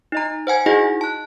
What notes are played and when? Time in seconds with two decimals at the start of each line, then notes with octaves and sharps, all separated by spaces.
0.12 D#4 D#5 A#5
0.47 C5 F#5 G#5 G#6
0.66 D#4 E4 F#4 G#4 D#5 F#5
1.01 A5 F#6